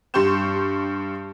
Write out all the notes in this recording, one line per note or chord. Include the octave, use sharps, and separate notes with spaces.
G2 G4 C6 C#6 G6 E7